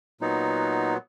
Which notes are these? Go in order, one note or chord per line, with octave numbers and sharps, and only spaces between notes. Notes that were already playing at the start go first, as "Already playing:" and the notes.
A#2 F#3 B3 D#4